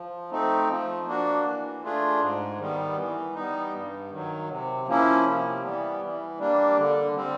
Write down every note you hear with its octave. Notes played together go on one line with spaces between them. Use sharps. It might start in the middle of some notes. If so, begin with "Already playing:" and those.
Already playing: F3
A3 C4 D#4
F3
A#3 D4 F#4
E3
A3 D4 F4 G#4
G#2
D#3 G3 B3
E3
G3 B3 D#4
G2
D#3 F#3
C3
F3 A#3 C#4 E4
C3
E3 G3 B3
E3
G3 A#3 D4
D3
G3 C4